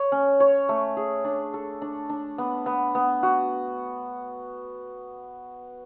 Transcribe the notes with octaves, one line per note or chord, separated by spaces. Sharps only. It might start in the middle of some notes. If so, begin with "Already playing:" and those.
Already playing: C#5
C#4
C#5
A3
G#4
D4
A4
D4
D4
B3
B3
B3
F#4